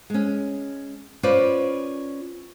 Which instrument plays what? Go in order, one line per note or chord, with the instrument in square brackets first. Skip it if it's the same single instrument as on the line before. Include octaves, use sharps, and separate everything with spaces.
[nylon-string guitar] G#3 C#4
C#4 F4 B4 C5 D5